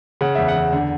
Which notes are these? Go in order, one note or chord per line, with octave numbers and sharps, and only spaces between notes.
C#3 F#5
E2 E5
F#5
E2
D3